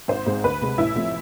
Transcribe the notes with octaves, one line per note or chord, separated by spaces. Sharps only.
G#1 C5
G#2 G#3 C4
D2 B4
C3 G#3
A1 E4
A2 F3 A3 C4